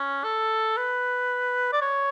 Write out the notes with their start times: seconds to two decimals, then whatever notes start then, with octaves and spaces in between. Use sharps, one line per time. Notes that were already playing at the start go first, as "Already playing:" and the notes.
Already playing: C#4
0.24 A4
0.77 B4
1.73 D5
1.82 C#5